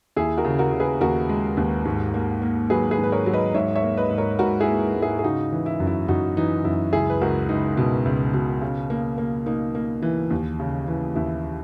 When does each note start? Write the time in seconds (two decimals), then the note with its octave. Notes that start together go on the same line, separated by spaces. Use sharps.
0.16 D#2 E4 G#4
0.37 F#4 A#4
0.45 C#3
0.59 F#4 A#4
0.72 C#3
0.80 G#4 B4
1.01 D#2 F#4 A#4
1.29 G#3
1.57 D#2
1.85 G#2
2.14 A#3
2.42 A#3
2.70 F#3 G#4 B4
2.91 G#4 B4
2.98 G#2
3.03 B4
3.12 A#4 C#5
3.26 F#3
3.33 B4 D#5
3.54 G#2 C#5 E5
3.76 C#5 E5
3.83 A#3
3.97 B4 D#5
4.11 G#2
4.18 A#4 C#5
4.39 G#2 F#4 A#4
4.60 E4 G#4
4.68 A#3
4.96 G#2
5.02 E4 G#4
5.19 G#4
5.23 C#3 D#4 F#4
5.52 E3
5.66 E4
5.80 F#2
5.87 E4
6.08 F#2 D#4 F#4
6.37 E3 D#4
6.65 F#2 E4
6.93 C#2 E4 G#4
7.10 B4
7.21 C#2 F#4 A#4
7.49 C#2 D#4
7.77 B2
8.05 C#2
8.34 B2
8.62 C#3
8.90 A#3
9.18 A#3
9.46 A#3 D#4
9.75 A#3
10.02 E3
10.31 D#2
10.60 C#3
10.88 E3
11.15 D#2 E4